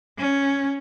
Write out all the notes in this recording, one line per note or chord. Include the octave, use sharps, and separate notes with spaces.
C#4